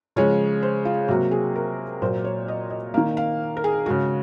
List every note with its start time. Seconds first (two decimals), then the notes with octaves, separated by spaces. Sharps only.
0.16 C#3 F3 G#3 C#5
0.63 C5
0.85 F4
1.08 C3 F#3 A#3 F#4
1.31 G#4
1.56 A#4
2.02 A#2 F#3 A#3 C5
2.24 C#5
2.48 D#5
2.70 D#5
2.94 D#3 A#3 F5
3.17 F5
3.57 A#4
3.64 G#4
3.86 C#3 G#3 F#4